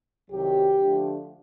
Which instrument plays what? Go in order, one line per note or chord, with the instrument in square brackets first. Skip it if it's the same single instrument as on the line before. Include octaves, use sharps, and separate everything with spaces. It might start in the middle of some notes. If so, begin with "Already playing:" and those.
[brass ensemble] C2 C3 D#3 F#3 G4
D3 F3 A3 D4